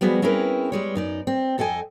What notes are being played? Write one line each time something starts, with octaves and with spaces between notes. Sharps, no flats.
F3 G3 B3 F#4 G#4 D#5
C4 C#4 E4 G#4 A#4 B4
G3 G#3 C#5
F#2 D#4 D5
C4
F2 A4 D#5 G5 G#5